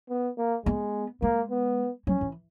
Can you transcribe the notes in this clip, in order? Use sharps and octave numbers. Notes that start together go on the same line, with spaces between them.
B3
A#3
G#3 B3
G#3 A#3
B3
F#3 C#4
E3